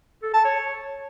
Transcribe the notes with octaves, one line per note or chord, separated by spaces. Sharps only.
A4
A5
C#5